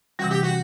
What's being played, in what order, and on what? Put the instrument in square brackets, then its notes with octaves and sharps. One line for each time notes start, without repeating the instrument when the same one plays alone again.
[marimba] C3 E3 G3 [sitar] F#4
[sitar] G4
F#4